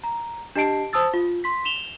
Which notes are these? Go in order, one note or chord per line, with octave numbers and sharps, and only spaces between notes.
A#5
D4 G4 D#5 A5 C7 D7
C5 A5 D#6 E6 A6
F4
C6 B6
E7 F7 G7